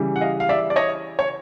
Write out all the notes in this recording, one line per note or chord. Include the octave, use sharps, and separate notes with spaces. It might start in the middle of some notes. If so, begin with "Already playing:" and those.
Already playing: C#3 E3 G3
F#5
D#5 F5
F5
D5 E5
D5
C#5 D#5
C#5